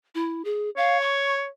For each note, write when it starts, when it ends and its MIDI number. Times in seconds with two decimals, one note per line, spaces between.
0.15 0.42 64
0.45 0.70 68
0.77 1.47 73
0.77 0.98 77
1.01 1.34 85